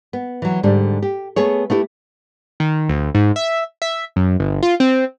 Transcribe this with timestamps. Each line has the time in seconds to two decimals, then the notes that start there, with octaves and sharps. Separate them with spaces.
0.13 B3
0.42 E3 F#3
0.63 G#2 D3 G3 D4
1.02 G4
1.36 A3 B3 G#4 C#5
1.70 A3 B3 E4 G4 B4
2.60 D#3
2.89 D2
3.15 G#2
3.36 E5
3.82 E5
4.16 F#2
4.39 G1
4.63 F4
4.80 C4